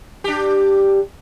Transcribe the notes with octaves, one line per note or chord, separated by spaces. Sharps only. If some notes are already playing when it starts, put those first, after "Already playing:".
D4 G4